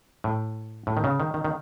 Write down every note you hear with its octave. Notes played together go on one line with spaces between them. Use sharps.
A2
A2
D#3
C#3
D#3
D#3
D#3